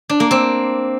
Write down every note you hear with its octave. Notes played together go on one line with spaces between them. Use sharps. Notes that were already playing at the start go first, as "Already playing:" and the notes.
D4
A#3
C4